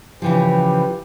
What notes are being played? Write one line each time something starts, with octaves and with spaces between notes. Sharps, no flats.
C#3 E3 F3 G4 B4